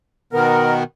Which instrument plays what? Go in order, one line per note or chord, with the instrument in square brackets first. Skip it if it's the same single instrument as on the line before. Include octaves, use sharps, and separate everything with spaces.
[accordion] B2 D#3 B3 [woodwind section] A#4